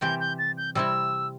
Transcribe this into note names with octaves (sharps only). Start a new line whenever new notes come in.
C3 E3 G3 C4 G4 G6
G6
A6
G6
C3 G3 C4 E4 E6